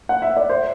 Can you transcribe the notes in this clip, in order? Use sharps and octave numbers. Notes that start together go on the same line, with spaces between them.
F#5
E5
D5
C5